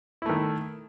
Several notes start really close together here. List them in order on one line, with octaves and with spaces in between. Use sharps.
E4 A3 D#3